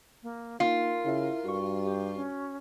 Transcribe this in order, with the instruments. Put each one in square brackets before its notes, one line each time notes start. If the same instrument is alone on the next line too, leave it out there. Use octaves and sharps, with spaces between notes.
[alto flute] A#3
[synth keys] A#3 D#4 [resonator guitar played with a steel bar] F4 [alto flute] A#4
[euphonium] C#3 [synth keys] E4 E5
[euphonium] G2 [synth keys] F#4 C#6
[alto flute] G4
C#4